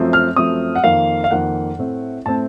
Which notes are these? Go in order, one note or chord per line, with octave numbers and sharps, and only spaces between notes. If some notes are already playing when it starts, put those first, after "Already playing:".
Already playing: F#2 F3 A3 C4
F6
F#2 F3 A3 C4 D#6
F#5
F2 D#3 A#3 F5
F5
F2 D#3 A#3 F#5
A2 A3 C4
A2 A3 C4 A5